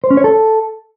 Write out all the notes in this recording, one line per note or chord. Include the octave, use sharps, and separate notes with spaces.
C5
C#4
C#5
A4